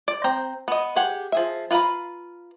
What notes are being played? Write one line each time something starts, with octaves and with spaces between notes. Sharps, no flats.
D5
C4 G5 A#5
B3 D#5
G4 G#4 F#5
F3 G#4 E5
F4 B4 F5 A#5 B5